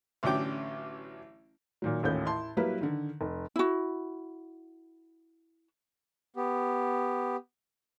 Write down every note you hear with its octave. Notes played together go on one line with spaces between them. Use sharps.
A1 D3 F#3 C#4 G5 D6
A#2 D#3 F#3
A1 D#2 A2 C#4 F4 G6
E4 A5 C6
F#3 G3 A#3 E4 B4
D3 D#3
F1
E4 F#4
B3 G4